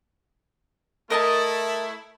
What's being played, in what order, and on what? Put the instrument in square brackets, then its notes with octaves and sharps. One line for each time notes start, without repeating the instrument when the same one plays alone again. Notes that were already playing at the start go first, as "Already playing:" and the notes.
[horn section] A3 E4 [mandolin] A#4 D#5 A5